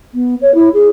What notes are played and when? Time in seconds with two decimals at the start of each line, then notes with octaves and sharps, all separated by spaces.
0.14 B3
0.42 C#5
0.55 E4
0.74 G#4